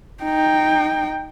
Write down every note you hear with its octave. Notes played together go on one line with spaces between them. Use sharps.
D#4 G5